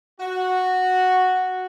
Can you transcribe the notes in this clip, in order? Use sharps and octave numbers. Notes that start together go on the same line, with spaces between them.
F#4